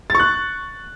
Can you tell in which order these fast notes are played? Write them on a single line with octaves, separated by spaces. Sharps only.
A6 C#6 F#6